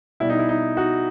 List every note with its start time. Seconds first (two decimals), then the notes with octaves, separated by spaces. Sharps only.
0.20 B2 G3 E4
0.30 D#4
0.39 E4
0.49 D#4
0.77 D#4 F#4